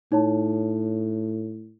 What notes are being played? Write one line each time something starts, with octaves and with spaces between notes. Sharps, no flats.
A2 D#4 C#5 A5